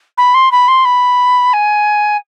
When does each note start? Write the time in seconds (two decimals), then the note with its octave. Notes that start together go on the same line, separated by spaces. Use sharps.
0.17 B5
0.34 C6
0.51 B5
0.68 C6
0.85 B5
1.53 G#5